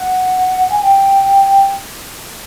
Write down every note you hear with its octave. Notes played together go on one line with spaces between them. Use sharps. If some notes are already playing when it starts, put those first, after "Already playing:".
Already playing: F#5
G#5
G5